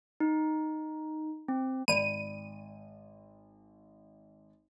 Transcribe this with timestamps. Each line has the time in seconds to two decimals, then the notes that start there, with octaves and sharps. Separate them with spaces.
0.20 D#4
1.48 C4
1.88 G#1 D5 B5 D#7